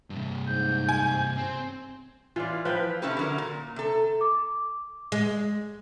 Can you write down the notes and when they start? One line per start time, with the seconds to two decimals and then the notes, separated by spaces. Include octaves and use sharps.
0.10 G2 C3
0.47 G#2 G6
0.89 G#5
1.36 C4
2.36 E3 F4 D5
2.65 F3 E4 B4 G5
3.02 C3 A3 C#4 E4 G4 B4
3.17 D3 F#3 A#4
3.38 A#2
3.76 C3 A4
4.21 D6
5.12 G#3